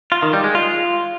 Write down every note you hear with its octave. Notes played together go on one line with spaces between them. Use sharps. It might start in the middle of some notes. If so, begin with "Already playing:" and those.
F4
D#3
G3
G#3
F4